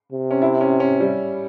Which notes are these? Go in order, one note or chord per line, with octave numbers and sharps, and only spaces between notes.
C3
C#4
E4
C#4
C#4
G3